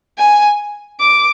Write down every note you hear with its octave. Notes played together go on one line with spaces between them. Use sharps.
G#5
D6